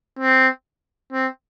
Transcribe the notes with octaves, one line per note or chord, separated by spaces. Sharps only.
C4
C4